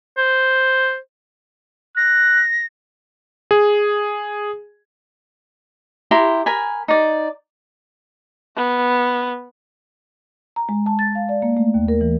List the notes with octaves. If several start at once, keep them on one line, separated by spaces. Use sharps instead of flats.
C5
F#6 A#6
G#4
E4 G4 A#5 C6
A#4 G#5 B5
D#4 D5
B3
A#5
G#3
A5
A6
F5
D5
A#3
A3
D#2
A#4
E3